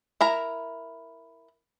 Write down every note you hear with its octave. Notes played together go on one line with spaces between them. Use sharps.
E4 A#4 A#5